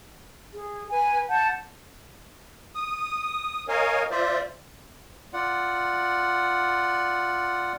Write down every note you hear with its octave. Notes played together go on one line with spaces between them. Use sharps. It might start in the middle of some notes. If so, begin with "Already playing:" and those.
G#4
B4 G#5
F#5 A5 G6
D#6
A#4 C#5 D#5 F5 G#5
F4 C5 D5 E5
F4 D5 F#5